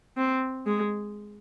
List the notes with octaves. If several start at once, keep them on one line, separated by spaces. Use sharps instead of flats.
C4
G#3